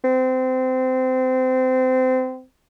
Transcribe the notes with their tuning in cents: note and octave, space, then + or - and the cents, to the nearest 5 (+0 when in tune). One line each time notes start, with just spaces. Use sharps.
C4 -25